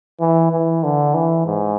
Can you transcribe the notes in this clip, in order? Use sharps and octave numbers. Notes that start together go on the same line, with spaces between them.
E3
E3
D3
E3
G#2